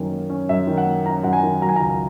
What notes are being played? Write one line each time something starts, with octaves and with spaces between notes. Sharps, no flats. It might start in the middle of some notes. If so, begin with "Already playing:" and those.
Already playing: F#2 D#3 A#3 C#4
A#3
C#4
F#2 E5
D#3
F#5
A#3
C#4 A#5
F#2 F#5
G#5
D#3
F#3 A#5
G#5
C#2 A#5
A#5